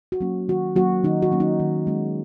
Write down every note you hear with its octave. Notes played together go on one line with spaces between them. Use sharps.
F#4
F#3 A#3 C#4
D#3 F#4
F#3 A#3 C#4 F#4
D#3 D#4
F#4
F#3 A#3 C#4
D#4
D#3
G#3 C#4